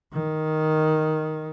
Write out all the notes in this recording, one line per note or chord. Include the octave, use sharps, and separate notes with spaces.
D#3